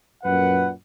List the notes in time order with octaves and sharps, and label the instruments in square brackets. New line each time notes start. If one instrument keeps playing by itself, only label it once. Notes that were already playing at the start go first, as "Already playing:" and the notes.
[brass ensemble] F#2 A#2 B4 F#5